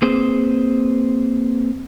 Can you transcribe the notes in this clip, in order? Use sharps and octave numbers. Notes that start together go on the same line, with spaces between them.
A#3 C4 G#4 B4 C5